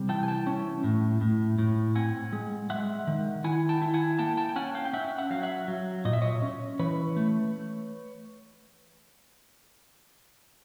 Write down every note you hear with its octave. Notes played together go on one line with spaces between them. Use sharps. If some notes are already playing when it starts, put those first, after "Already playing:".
Already playing: C3 G3
E3 G5 A5
G#5
G5 A5
C#4
A2
A2
A2
C4 F#5 G#5
G#3
G#3 E5 F#5
D#3
E4 F#5 G#5
G5 A5
E4
F#5 G#5
A#3 G5 A5
G5 A5
G5
C#4 F#5 G#5
F5 G5
G5
C#4 E5 F#5
E5 F#5
F#3 F5
E5 F#5
F#3
A#2 D#5
E5
C#5 D#5
C#4
E3 B4 C#5
A3